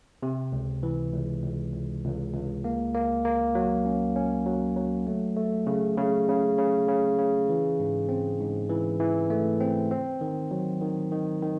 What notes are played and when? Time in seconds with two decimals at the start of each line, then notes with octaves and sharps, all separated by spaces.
0.23 C3
0.52 C#2
0.83 E3
1.13 C#2
1.43 C#2
1.73 C#2
2.04 C#2
2.34 C#2
2.64 A#3
2.95 A#3
3.25 A#3
3.55 F#3
3.86 C#4
4.16 C#4
4.46 F#3
4.76 F#3
5.07 A3
5.36 A3
5.67 C#3
5.97 C#3
6.28 C#3
6.58 C#3
6.89 C#3
7.19 C#3
7.49 E3
7.80 G#2
8.09 C4
8.40 G#2
8.70 E3
9.00 E3
9.30 A3
9.60 C4
9.91 C4
10.21 D#3
10.51 F#3
10.82 D#3
11.12 D#3
11.43 D#3